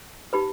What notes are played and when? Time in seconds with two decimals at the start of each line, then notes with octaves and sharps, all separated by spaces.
0.33 D#4 G4 B4 B5